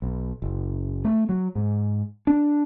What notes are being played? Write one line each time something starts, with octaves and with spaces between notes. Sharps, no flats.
B1
F#1
A3
F#3
G#2
D4